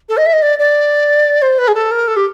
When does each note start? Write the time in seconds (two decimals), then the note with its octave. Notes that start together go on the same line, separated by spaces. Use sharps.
0.09 A4
0.17 D#5
0.26 E5
0.33 D#5
0.42 D5
0.59 D5
1.42 C5
1.58 B4
1.68 G#4
1.75 A4
1.91 A#4
2.08 A4
2.16 G4